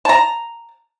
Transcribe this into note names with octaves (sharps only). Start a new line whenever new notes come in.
A5 A#5